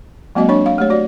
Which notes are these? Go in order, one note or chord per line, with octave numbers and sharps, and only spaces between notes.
F#3 G#3 A#3 C4 F#4 D#5
D4 C#5 C#6
F5
A3 G4 C#5
F#4 D5